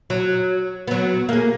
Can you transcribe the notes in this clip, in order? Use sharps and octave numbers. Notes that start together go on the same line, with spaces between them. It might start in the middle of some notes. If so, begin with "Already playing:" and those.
F#3
F#3 B3
A#3 G#4